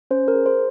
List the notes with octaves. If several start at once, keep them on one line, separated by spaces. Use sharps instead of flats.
C#4 C5
A#4
G#4
C5